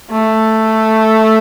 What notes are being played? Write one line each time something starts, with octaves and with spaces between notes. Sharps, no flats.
A3